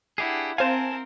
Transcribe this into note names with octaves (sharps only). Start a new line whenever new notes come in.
D4 E4 G4 G#4 F#5
C4 A#4 C5 F5 G#5 A5